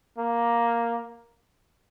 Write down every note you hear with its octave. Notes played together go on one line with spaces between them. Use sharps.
A#3